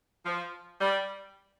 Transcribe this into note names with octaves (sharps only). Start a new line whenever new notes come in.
F3
G3